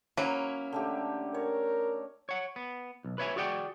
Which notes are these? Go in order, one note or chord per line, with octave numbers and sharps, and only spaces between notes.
F#3 A#3 C#4 E4
D3 A3 G4
A#4 C#5
C#5 F#5
B3
B1
B4 C#5 E5 G#5
F#4 G#4 D5 F#5 G5